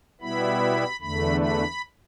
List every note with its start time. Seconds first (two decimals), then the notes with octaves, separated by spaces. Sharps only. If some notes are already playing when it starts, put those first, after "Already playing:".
0.21 B2 G3 B3 E4 B5
1.01 E2 D3 A3 B5
1.40 B5